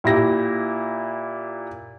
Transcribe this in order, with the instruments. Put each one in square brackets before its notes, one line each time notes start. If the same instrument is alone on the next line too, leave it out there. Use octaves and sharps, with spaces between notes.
[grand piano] A#2 E4 G4 A#6